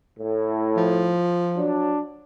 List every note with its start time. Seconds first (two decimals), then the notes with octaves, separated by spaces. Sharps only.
0.18 A2
0.77 F3
1.56 F#3 D4